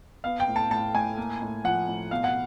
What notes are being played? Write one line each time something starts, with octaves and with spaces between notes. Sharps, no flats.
B3 F5
G5
A2
A5
A2 A5
A2 G#5
A#3
A2
F3 F#5
A2
B2 F5
F#5